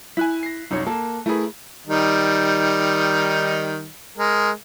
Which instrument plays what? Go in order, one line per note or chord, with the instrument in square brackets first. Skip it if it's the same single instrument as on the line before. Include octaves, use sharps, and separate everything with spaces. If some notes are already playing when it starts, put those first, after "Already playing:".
[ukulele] E4 [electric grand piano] G#5 F#6 B6
[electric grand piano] A#6 C7
[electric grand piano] C2 F#2 [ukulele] D#4 C#5
[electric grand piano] A#3 [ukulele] A4 A#4
[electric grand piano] A3 G#4 [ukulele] E4 A#4 B4
[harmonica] D#3 G3 D#4
G#3 A#4